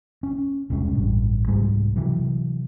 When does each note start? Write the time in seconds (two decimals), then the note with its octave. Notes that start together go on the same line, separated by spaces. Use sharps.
0.23 C#4
0.70 E1 C2 G#3 C#4
0.93 A1 G2
1.48 C2 G#2 G3 G#3
1.96 C3 E3 F#3